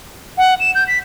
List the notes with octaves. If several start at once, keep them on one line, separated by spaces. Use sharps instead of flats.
F#5
E7
G6
B6